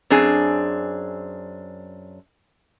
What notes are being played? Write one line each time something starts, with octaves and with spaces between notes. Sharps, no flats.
F#2 C4 D4 G#4